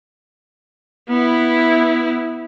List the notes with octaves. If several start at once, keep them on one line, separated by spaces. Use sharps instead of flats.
B3 E4